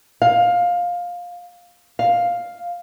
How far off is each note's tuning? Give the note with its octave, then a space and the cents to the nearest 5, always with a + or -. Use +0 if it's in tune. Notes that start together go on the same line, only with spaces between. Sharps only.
F5 +15
F5 +5